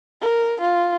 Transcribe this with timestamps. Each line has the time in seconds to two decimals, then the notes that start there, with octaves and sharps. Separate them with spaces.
0.22 A#4
0.61 F4